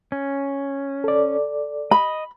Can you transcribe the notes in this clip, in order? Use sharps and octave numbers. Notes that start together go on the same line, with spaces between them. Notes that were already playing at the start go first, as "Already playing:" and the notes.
C#4
A4 D5
D#5 B5